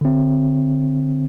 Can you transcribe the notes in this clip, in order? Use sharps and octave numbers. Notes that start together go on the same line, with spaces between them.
D3 C4